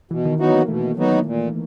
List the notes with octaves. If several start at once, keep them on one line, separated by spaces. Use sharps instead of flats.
B2 E3
D#3
E3 F#3 B3 D#4 F#4
A#3
B2 A3
F#3 B3 D#4 F#4
A#2